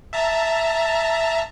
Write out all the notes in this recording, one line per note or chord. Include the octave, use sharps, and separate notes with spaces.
E5 A5 A#5